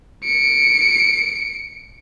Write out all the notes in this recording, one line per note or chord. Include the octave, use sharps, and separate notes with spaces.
C#7 D7